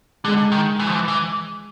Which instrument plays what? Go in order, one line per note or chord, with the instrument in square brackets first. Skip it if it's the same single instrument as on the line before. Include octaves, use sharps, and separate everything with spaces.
[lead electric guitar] D3 [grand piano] G#3
[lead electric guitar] D#3
E3
F3
E3
E3